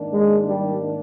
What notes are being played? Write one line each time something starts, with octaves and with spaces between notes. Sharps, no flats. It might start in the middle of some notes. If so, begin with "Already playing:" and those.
Already playing: G#2 D#3 A#3 D4
G#3
G3